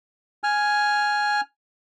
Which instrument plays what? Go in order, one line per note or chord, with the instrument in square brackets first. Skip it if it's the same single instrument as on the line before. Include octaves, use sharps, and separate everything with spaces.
[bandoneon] G#5 F6